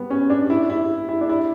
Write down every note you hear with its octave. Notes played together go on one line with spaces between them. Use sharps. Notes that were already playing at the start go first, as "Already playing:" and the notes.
Already playing: G3 B3
C#4
D4
E4
E4
E4
D4
E4